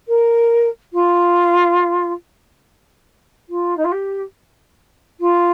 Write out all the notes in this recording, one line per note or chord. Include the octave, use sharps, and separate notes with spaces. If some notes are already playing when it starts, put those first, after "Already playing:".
A#4
F4
F4
D#4
F4
G4
F4